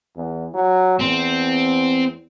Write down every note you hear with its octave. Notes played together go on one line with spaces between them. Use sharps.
E2
F#3
E2 C4